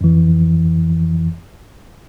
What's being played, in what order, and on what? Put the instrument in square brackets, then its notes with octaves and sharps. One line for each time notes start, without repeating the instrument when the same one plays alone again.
[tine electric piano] F2 E3